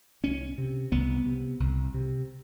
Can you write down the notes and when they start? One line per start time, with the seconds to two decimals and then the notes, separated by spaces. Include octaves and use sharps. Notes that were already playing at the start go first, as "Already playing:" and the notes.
0.23 C2 C#4
0.58 C3
0.92 C2 B3
1.26 C3
1.60 C2
1.94 C3